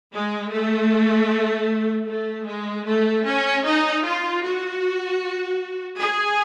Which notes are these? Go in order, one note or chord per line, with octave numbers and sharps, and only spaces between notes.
G#3
A3
A3
G#3
A3
C#4
D#4
F4
F#4
G#4